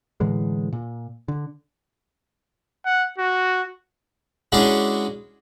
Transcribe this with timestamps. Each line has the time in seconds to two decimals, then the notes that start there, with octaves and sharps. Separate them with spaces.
0.20 A2 D3 E3 G#3
0.73 A#2
1.28 D3
2.85 F#5
3.18 F#4
4.52 G#3 C#4 D4 E4 F#4 G#4